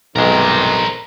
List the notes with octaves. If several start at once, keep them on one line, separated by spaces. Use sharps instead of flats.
B1 G2 C3 D#3 G#3 A#4 C5